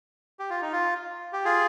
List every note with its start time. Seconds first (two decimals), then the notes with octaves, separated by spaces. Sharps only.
0.39 G4
0.50 F4
0.62 D#4
0.72 F4
1.33 G4
1.45 F4 G#4